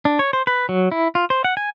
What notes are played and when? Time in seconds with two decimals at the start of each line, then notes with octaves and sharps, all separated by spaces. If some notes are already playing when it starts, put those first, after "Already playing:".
0.05 D4
0.19 C#5
0.33 C5
0.47 B4
0.69 F#3
0.92 E4
1.15 F4
1.30 C5
1.44 F#5
1.57 G#5